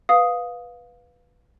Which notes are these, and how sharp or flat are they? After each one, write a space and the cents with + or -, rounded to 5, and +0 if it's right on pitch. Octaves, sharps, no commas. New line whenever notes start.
B4 +0 F5 +15 D#6 +0